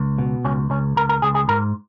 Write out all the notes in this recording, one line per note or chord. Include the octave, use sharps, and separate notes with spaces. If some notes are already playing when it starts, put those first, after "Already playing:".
Already playing: C#2
B2
C#2 C#4
C#2 C#4
C#2 A#4
A#4
C#2 G#4
G#4
G#2 A#4